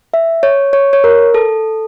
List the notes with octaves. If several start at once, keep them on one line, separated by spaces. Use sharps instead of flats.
E5
C#5
C#5
C#5
A#4
A4